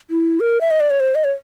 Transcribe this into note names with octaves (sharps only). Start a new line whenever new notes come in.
E4
A#4
E5
D#5
D5
C#5
C5
D#5
C#5